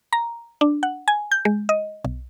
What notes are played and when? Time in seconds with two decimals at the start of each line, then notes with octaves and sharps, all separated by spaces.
0.13 A#5
0.61 D4
0.83 F#5
1.08 G#5
1.31 G6
1.45 G#3
1.69 D#5
2.05 B1